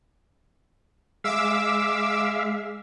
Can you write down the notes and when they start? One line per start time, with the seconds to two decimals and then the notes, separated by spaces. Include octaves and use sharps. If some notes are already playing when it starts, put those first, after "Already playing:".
1.24 G#3 E5 F5 D6 E6